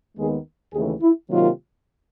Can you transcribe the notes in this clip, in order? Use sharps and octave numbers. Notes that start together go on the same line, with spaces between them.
D#2 D#3 G#3 B3 G#4
D#2 C#3 E3 A3 G#4
E4
C3 D#3 F#3 A#3 F4